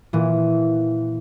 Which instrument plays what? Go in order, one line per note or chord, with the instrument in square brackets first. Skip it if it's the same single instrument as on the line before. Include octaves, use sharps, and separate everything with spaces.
[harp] A#2 E3